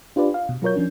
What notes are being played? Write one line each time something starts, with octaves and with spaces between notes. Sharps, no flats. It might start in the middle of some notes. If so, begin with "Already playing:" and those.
D4 F4 G4 B4 D5
F5
B2
F#3 F4 A#4 C#5 G6
F3 C#4 D4